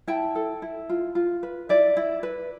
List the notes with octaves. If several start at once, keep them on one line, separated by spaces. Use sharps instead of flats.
E4 G5 A5
A4
E4
F4
F4
B4
E4 D5 E5
E4
B4